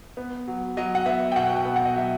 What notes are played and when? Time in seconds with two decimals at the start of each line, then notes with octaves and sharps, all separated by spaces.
0.17 B3
0.48 F#3
0.77 F#3 D#5
0.95 F#5
1.06 B3 E5
1.32 G5
1.36 B2 F#5
1.56 G5
1.65 B3
1.76 F#5
1.85 D#5
1.95 F#3 E5